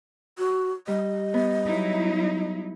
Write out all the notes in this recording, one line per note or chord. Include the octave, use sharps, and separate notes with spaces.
F#4
G3 D#5
B3
F#3 D#4 E4